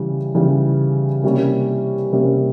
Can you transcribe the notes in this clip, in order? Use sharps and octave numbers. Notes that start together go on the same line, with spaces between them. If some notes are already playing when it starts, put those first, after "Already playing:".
Already playing: C#3 E3 G3
C#3 E3 G3
C3 G3 A#3 C#4
C3 G3 A#3 C#4